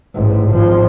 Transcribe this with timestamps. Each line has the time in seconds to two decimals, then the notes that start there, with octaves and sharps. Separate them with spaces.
0.15 A1 G#2
0.51 G#1 F3